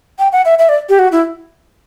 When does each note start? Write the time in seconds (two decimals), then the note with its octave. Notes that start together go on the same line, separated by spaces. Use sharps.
0.19 G5
0.32 F#5
0.45 E5
0.59 E5
0.69 D5
0.89 G4
0.99 F#4
1.12 E4